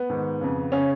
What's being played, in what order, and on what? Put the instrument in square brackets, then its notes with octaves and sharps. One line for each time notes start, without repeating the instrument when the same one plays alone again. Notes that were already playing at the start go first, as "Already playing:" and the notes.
Already playing: [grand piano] B3
G#2 D#3
F2 C#3
C#3 C#4